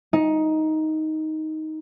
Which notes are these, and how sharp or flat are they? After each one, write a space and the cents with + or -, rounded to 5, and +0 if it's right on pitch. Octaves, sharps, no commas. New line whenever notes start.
D#4 +10